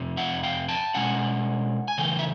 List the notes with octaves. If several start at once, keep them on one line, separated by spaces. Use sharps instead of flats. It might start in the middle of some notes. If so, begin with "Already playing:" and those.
Already playing: F2 C3
E5 F#5
F5 G5
G5 A5
B2 G#3 C#4 F#5 G#5
G#5
C#3 E3 A3 G5
E5